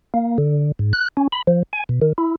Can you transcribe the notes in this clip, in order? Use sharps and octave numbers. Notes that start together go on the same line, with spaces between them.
A#3
D3
G#2
F#6
C#4
B5
F3
G#5
B2
D#3
E4